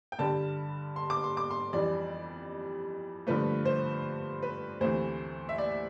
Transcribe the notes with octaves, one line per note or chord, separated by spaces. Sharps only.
G5
G2 D3 G3 A5
C6
D6
C6
D6
C6
F2 E3 G3 D5
G2 D3 F3 A3 B4
C5
B4
D2 C3 E3 A3 C5
E5
D5